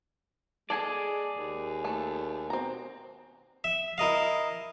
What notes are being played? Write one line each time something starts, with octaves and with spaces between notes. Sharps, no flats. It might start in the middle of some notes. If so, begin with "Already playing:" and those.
G#3 G#4 A4 D5 G#5 A5
D#2
A3 A4
B2 C4 A#5
E5
E4 A#4 D#5 F5